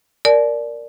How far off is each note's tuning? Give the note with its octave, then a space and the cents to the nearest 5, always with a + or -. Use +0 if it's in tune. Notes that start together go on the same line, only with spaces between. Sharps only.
A#4 +0 D5 +0 A5 -45